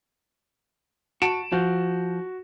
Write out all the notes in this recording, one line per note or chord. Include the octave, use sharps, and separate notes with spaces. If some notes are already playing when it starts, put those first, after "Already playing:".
F#4 A5 D7 E7
F3 F#4